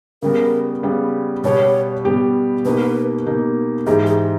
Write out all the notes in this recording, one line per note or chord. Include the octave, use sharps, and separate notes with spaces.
C#3 G3 B3 A#4
C#3 G3 B3
B2 G3 B3 G4 C#5
B2 G3 B3 G4
B2 A#3 D#4 G4 B4
B2 A#3 D#4 G4
G#2 E3 G#3 D#4 G4 G#4
G#4